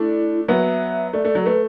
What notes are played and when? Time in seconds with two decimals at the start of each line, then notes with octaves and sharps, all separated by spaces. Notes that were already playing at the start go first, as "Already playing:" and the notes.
Already playing: A3 D4 E4
0.48 F#3 B3 E5
1.13 A3 D5
1.25 A3
1.35 F#3
1.42 A4
1.46 A3 B4